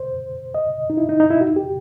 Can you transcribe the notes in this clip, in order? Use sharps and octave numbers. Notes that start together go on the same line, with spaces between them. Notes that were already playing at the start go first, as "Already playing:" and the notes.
Already playing: C5
D#5
D#4
E4
D#4
D#4
E4
F#4
G4